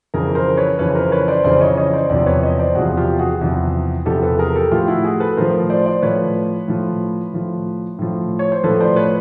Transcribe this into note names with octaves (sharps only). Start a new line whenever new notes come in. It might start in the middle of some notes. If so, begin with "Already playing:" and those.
F2 C#3 E3 G#4 A#4
A#4 C5
B4 C#5
F2 C#3 E3 B4 C#5
A#4 C5
B4 C#5
C5 D5
F2 C#3 E3 C5 D5
C#5 D#5
C#5 D#5
C5 D5
E2 C3 F3 C5 D5
B4 C#5
C#5 D#5
C5 D5
E2 C3 F3 F#4 G#4
F4 G4
F#4 G#4
E2 C3 F3
E2 C3 F3 G4 A4
A4 B4
G#4 A#4
G4 A4
A2 F3 F4 G4
E4 F#4
F#4 G#4
A4 B4
A2 F3 A#4 C5
C5 D5
C5 D5
A2 F3 B4 C#5
A2 F3
A2 F3
A2 F3
C#5
C5
A2 F3 A4 B4
C5 D5
B4 C#5